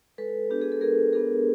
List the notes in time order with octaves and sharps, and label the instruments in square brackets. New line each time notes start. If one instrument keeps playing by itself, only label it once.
[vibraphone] G#3 A4 B4
B3 D4 F#4 G4
G#4
A4
G#3 G#4 A#4
B3 D4 F#4 G#4 A#4